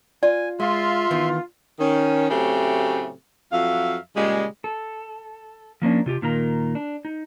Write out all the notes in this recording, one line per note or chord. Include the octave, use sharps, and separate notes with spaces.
F4 D5 G#5
G#3 F4 E5 C6
D#3 E3 B3
D#3 C#4
A2 C#3 F#3 A3 C4 G4
F2 F#3 E5 F5
A#2 C#3 G3 G#3
A4
F3 A#3 C#4 D4
C3 F4 G4
A#2 D#3 F4 A#4 A#5
D4
D#4